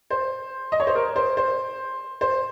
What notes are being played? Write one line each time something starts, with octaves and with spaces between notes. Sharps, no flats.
C5
D#5
C#5
C5
A#4
C5
C5
C5